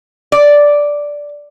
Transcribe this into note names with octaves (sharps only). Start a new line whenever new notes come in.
D5